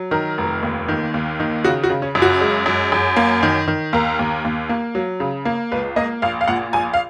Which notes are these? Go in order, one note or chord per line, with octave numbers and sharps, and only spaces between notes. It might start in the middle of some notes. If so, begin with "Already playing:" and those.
Already playing: F#3
D#3 A#4
F1
D#2
D#3
D#2
D#3
C#3 F#4
F#4
C#3
C#4
F#2
F#4
G#3
F#2
F#2
A#3
D#3
D#3
D#2 A#4
D#2
D#2
A#3
F#3
C#3
A#3
C#2 B4
A#3 D#5
A#1 F5
F5
A#2 F#5
A#1 G#5
F5